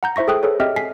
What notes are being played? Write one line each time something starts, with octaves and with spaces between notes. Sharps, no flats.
F#5 A#5 G6
E4 C5 E5 C#6 A#6
G#4 A4 G5 D#6 F#6
G#4 A4 B4 C#5
C4 G4 D#5 E5 G5 F6
G#5 B6 C7